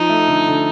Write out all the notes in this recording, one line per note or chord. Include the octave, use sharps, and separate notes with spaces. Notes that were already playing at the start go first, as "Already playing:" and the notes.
Already playing: F3 D#4
A3
D3
D3